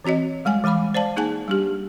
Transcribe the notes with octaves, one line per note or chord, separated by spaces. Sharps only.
E3 C4 F#4 C#5 D#5
G3 G#3 F#5 G#5
E3 G#3 F5 B5 D6
C5 D5 F5 A5
A#3 D#4 G#4 F#5 G#5 A5
G3 D4 G4